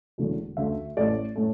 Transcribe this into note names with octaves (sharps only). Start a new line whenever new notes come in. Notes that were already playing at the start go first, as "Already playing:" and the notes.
E1 E2 D3 F#3 A3
D2 D3 A3 E5
A1 A2 A3 D5
A2 A3